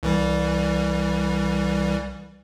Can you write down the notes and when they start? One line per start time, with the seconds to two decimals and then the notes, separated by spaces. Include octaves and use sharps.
0.03 C2 E3 G3